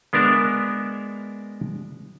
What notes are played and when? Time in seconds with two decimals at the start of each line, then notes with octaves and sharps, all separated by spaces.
0.13 G#3 B3 D4 A#4 E5